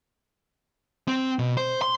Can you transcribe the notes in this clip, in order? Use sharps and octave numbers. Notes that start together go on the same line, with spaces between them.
C4
B2
C5
C6